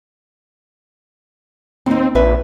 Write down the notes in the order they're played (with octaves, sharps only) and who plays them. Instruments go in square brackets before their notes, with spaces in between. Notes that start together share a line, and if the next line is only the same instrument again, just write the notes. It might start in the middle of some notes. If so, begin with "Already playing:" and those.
[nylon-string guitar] D#2 D#4 [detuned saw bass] C4
[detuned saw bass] A#1 [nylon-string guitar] E2 B4 E5